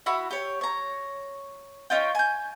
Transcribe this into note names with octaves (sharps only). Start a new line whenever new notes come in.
E4 F#4 B5
G4 C#5
C#5 A#5
C#4 D#4 F4 G5
G#5 G6